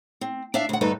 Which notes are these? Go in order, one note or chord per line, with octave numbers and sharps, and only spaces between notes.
C4
D4 D5 E5 F5
D2 F#5
D2 G2 D#4 A4 B4